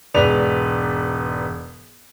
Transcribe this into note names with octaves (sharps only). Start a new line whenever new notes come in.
E1 G#2 B4 D5 F#6 F7